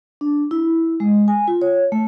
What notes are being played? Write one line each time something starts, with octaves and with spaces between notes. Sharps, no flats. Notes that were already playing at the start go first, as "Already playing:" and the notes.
D4
E4
G#3
G#5
F4
C#5
A3